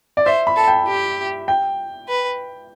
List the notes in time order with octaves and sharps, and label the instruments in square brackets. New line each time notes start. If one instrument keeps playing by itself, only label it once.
[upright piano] D5
[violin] C5 [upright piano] E5
[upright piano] B5
[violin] A4
[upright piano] G5
[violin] G4
[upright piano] G5
[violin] B4